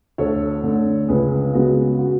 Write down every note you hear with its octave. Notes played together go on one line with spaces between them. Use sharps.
D2 A4 C#5
D3 A3
C#2 G#4 B4
C#3 G#3 B3 F#4
F#4